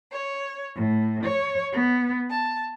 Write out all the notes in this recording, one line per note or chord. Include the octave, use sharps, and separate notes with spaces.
C#5
A2
C#5
B3
A5